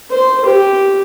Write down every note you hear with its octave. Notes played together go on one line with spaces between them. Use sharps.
C5
G4